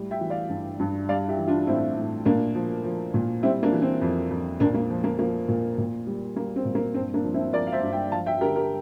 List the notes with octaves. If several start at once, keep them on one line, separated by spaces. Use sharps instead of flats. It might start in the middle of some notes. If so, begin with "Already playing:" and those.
Already playing: A2 G3
E5 G5
E3
D5 F5
G2
G2
G3 D5 F5
E4 G4
E3
D4 F4
A2 C4 E4
A2
A#2 A#3 D4
F3
F3
A#2
G3 C4 E4
A#3 D4
E3
C4
F2
F2
A#2 A#3 D4
A#3
F3
A#3
F3 A#3
A#2
A#2
G3
G3 A#3
C4
A#2
A#3
G2 C4
A#3 D4
F3
C4 E4
F3 A#4 D5
F5
C5 E5
G2
E5 G5
F3 F5 A5
E5 G5
D3 G4 A#4
G4 A#4